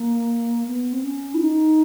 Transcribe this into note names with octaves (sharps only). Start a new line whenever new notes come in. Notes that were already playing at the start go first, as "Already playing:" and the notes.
Already playing: A#3
B3
C4
C#4
E4
D#4